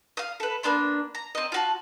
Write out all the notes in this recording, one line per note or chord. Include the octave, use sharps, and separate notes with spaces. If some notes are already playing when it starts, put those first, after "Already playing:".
F5 D#6
A4 B4
A#3 B3 D4 C6
A#5
C4 D#5
F4 F#4 A5